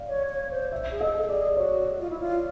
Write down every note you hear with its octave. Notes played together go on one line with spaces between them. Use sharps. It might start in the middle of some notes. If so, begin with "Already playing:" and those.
Already playing: D5 F5
C#5
C#5
C5
E5
G#4
A4 D#5
A4
G#4 D5
F#4 C#5
F4
E4
F4